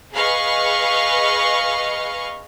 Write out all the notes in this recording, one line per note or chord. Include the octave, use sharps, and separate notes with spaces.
G#4 B4 D#5 F5 C#6